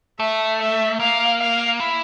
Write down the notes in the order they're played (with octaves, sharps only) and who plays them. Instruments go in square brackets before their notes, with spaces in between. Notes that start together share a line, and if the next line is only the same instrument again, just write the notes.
[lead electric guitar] A3 [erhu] E5
[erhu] E5
[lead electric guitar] A#3 [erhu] F5
[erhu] F5
[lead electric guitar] E4